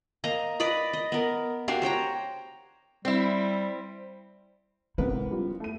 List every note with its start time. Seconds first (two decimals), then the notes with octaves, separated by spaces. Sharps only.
0.24 A#3 D#5 A#5
0.60 B4 D5 D#5 B5
0.93 D#5
1.12 B3 A#4
1.68 D4 F#4 G4 F5
1.82 C5 C#5 G5 A#5
3.05 G3 C4 E4
4.98 G#2 C3 B3 E4 A#4 B4
5.31 C#3 F3 G3
5.60 A3 D#7